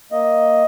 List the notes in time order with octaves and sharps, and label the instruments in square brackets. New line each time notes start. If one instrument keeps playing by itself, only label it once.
[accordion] A#3 D#5